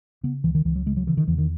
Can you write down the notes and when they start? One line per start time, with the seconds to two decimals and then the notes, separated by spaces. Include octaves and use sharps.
0.23 C#3 B3
0.44 C#2 E3
0.55 D#3
0.65 C#2 E3
0.76 F#3
0.86 C#3 G#3
0.97 F#3
1.07 C#3 E3
1.17 D#3
1.28 E2 E3
1.38 D#3